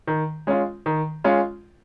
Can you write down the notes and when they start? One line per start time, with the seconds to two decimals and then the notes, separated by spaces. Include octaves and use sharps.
0.07 D#3
0.47 G#3 C#4 F4
0.86 D#3
1.24 G#3 C#4 F4